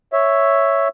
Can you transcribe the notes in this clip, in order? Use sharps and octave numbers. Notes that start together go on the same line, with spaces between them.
C#5 E5